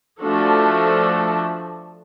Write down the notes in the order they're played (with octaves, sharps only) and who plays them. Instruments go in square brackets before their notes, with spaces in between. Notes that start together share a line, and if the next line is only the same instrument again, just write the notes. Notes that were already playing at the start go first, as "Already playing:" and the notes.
[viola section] F3 A3 D4 F#4 A4